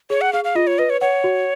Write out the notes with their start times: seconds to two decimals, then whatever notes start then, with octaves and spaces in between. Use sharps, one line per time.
0.10 G#4 C#5
0.21 F#5
0.33 G#4 F5
0.44 F5
0.55 F4 D#5
0.67 C#5
0.78 B4 D#5
0.90 C#5
1.01 C#5 F#5
1.24 F#4